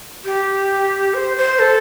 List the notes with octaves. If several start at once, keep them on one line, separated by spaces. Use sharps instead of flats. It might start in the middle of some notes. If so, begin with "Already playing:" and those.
G4
C5
C5
A4